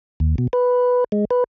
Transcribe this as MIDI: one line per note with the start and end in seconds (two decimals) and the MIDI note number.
0.20 0.35 39
0.38 0.47 47
0.53 1.04 71
1.12 1.25 56
1.31 1.44 71